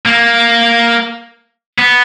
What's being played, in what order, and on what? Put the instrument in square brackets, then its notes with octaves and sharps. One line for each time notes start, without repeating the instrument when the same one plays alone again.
[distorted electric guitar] A#3
B3